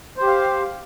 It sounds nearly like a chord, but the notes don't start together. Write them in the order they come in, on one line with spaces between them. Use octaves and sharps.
C5 G4 F5